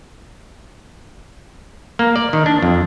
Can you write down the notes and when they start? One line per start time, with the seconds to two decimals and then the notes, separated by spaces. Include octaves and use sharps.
1.99 A#3
2.16 D5
2.33 D#3
2.46 D4
2.62 F2